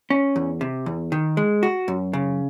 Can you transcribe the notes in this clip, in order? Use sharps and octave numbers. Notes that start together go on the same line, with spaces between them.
C#4
E2
C3
E2
D#3
G#3
F#4
F#2
C#3